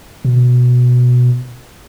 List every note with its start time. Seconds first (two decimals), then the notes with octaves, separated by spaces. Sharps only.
0.25 B2